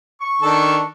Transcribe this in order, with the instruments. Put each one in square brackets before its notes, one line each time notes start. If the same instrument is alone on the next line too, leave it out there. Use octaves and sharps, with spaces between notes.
[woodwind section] C#6
[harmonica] D#3 D4 A4